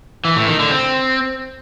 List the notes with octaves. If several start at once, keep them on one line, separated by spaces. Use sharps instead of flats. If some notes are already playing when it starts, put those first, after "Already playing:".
E3
A2
D#3
D3
C4